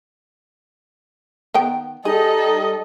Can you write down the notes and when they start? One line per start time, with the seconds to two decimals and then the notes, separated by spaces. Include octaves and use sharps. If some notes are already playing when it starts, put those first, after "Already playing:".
1.54 D#3 B3 G5
2.05 G3 D#4 G#4 A4 D#5